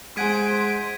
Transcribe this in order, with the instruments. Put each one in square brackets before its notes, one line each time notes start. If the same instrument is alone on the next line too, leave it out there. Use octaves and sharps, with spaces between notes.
[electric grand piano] G#3 F#5 G#5 [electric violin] C5 D7 [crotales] G#6 B6 D#7